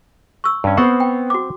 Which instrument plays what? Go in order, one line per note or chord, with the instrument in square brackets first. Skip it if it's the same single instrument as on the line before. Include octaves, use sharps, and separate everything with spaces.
[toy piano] C#6 E6
[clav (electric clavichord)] G2 C#4
[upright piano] B3 [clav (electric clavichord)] C4 C5 F#5 [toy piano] C#6
[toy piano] G5
F#4 D6